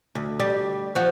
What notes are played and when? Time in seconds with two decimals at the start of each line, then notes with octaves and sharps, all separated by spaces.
0.15 D2
0.40 G3
0.95 F3 F#4